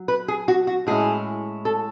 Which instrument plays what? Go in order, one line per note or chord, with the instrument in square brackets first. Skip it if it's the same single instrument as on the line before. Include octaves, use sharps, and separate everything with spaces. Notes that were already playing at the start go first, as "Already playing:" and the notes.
Already playing: [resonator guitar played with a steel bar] F#3
B4
G#4
F#4
F#4
A2 G#3 C#4 E4 G#4
A4